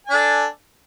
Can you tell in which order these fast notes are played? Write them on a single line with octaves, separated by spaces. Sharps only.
G#5 D4 A4